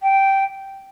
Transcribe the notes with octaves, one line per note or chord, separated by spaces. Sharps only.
G5